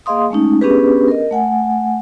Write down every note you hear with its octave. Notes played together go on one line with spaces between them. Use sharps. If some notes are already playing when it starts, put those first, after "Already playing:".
A#3 G#4 D#5 F5 C6 D#6
G#3 A3 C#4 D#4
B3 C#4 D4 G4 G#4 B4
A#4 D#5
A3 F#5 G#5